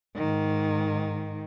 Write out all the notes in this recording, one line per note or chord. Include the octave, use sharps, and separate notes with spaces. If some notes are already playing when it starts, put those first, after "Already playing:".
G#2 D#3